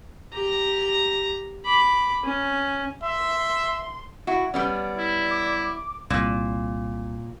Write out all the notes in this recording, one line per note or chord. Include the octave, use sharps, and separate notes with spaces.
G4 A#5
B5 D6
C#4
E5 C6
E4 F#4
G3 B3 C#4 D5
E4
D6
C2 A#2